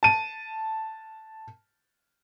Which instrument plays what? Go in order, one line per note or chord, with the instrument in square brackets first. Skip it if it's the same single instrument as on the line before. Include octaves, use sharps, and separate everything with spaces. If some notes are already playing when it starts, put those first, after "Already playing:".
[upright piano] A5 D#7